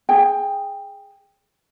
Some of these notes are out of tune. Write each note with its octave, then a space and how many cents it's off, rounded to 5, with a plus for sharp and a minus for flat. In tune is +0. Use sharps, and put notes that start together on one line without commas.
G#4 +0 G5 +15